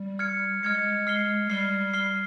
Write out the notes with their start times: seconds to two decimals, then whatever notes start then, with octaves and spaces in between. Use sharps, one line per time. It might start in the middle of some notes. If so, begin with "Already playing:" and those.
Already playing: G3
0.19 F6 G#6 C#7
0.62 G#3 F6 G#6 C#7
1.07 F6 C7 G7
1.50 G3 F6 C7 G7
1.93 F6 C7 G7